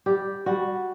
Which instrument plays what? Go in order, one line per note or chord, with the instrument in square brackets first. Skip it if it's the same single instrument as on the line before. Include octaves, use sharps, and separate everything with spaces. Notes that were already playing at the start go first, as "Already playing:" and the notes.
[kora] G3 G4
G3 F#4